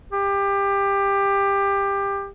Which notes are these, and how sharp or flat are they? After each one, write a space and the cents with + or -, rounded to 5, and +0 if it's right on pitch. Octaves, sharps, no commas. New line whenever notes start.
G4 +20